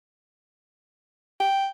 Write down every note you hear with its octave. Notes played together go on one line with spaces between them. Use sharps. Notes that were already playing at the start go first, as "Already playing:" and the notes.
G5